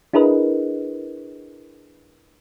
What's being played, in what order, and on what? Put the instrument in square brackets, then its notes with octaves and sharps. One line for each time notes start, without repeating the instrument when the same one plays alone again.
[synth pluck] D4 E4 G#4 A#4 B4 D#5